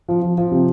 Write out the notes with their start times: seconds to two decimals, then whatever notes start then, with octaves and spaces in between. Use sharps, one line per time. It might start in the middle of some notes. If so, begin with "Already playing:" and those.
0.09 F3
0.22 F3
0.38 F3
0.52 C3